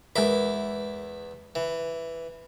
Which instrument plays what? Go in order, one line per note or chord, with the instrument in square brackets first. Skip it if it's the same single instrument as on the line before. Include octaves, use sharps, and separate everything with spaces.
[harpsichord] E2 E4 D6 [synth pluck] G#3 A#4 B4
[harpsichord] E3